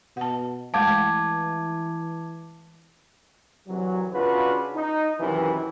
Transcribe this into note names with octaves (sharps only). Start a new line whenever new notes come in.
B2 F#5 A5
E3 G#3 A3 F5 A5 D6 G#6
C2 E3 F#3
C#3 D4 F4 F#4 B4
D#4
F#2 C3 D#3 E3